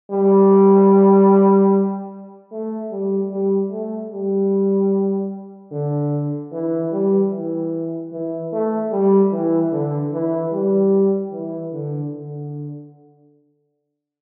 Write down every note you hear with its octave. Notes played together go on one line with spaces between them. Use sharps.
G3
A3
G3
G3
A3
G3
D3
E3
G3
E3
E3
A3
G3
E3
D3
E3
G3
E3
D3
D3